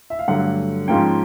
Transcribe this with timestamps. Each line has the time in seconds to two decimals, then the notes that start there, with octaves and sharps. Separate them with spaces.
0.10 E5
0.19 F5
0.28 G2 D3 F#3 A3 F#5
0.88 G#2 F3 A#3 C#4 G5